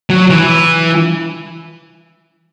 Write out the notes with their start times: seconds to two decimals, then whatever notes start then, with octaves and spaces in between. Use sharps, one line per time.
0.10 F#3
0.30 E3